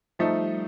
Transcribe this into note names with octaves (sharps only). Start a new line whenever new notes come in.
F3 G3 A3 D#4